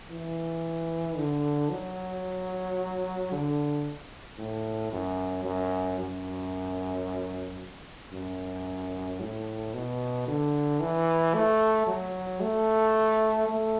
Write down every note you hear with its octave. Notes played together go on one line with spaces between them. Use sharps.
E3
D3
F#3
D3
A2
F#2
F#2
F#2
F#2
A2
B2
D3
E3
A3
F#3
A3
A3